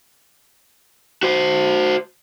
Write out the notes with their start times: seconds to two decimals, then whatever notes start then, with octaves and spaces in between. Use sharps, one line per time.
1.23 F#4 C5